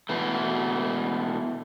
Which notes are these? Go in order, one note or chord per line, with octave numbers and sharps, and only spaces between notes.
B2 E3 A3